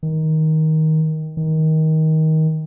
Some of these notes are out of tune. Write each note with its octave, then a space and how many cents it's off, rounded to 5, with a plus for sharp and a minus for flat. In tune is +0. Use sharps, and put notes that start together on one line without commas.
D#3 +15
D#3 +20